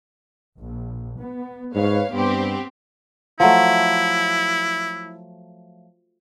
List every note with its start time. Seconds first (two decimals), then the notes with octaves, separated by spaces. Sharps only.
0.59 A#1
1.18 B3
1.75 G#2 B4 C#5 F5
2.14 G2 B3 C4 G4
3.40 F3 F#3 A3 E4